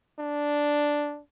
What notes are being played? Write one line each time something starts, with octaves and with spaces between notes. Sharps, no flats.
D4